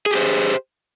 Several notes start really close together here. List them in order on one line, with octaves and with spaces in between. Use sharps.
G#4 G4 C5